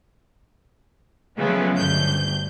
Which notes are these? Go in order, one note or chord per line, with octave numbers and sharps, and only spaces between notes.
C#3 F3 F#3 G#3 A3 B3
G1 D2 G6